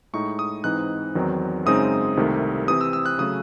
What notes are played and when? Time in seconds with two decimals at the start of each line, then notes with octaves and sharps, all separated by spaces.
0.13 A2 G#3 D#4 C#6
0.39 D#6
0.64 G#2 E3 C4 D#4 F#6
1.15 E2 D#3 F#3 C4 D#4
1.66 F#2 C#3 G#3 C4 D#4 D#6
2.17 C2 C3 D#3 A3
2.67 C3 E3 C4 D#6
2.81 E6
2.93 E6
3.06 F#6
3.19 C#3 F#3 A3 C#4 D#6